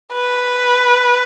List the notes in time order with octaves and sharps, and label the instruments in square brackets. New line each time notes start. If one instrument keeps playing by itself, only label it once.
[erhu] B4